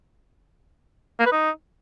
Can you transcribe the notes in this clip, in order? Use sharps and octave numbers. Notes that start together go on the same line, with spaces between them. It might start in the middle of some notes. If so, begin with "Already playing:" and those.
A#3
B4
D#4